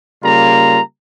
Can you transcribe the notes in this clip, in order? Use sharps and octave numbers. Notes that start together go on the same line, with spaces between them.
C#3 G3 A#3 F4 A#5